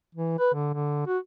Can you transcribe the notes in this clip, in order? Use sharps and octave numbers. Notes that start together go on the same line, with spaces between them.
E3
B4
D3
D3
F#4